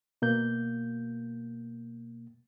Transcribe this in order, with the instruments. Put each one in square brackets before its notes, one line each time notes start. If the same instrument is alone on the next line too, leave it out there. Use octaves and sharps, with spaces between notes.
[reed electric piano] B2 A#3 G6